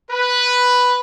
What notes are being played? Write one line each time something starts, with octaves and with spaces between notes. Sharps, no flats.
B4